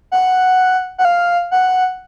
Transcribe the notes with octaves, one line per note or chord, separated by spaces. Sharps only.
F#5
F#5
F5
F#5